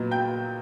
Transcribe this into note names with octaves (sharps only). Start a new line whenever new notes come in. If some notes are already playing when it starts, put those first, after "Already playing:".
Already playing: A#2 F#3 B3 D#5
G5 G6